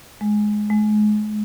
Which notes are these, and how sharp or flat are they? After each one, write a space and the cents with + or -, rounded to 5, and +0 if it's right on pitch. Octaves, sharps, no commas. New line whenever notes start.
G#3 +15
G#3 +35